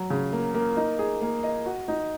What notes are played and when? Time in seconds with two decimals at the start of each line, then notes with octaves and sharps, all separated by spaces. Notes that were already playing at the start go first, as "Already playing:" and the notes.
Already playing: F#3
0.10 C#3
0.32 A#3
0.54 A#3
0.77 D#4
0.99 G#4
1.21 A#3
1.44 D#5
1.66 F#4
1.88 D#4